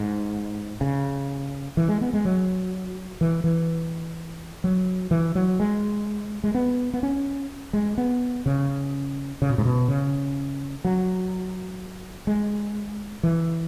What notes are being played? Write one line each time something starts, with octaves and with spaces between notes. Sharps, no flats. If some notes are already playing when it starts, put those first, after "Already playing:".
Already playing: G#2
C#3
E3
G#3
B3
G#3
F#3
E3
E3
F#3
E3
F#3
G#3
G#3
B3
B3
C#4
G#3
B3
C#3
C#3
B2
G#2
B2
C#3
F#3
G#3
E3